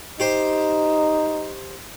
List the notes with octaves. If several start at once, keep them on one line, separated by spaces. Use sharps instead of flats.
D#4 G4 C5